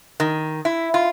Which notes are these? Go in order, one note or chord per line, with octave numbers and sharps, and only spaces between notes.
D#3
E4
F4